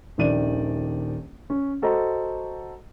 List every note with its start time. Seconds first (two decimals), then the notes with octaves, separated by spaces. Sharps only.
0.18 D#1 A#1 D#3 D5 D#7
1.50 C#4
1.82 F#4 A4 C5 D#5 A#5